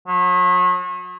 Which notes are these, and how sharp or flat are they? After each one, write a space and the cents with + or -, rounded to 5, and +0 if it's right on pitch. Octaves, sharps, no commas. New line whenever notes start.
F#3 -40